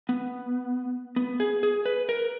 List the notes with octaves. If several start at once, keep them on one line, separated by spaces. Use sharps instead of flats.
B3
B3
G#4
G#4
B4
A#4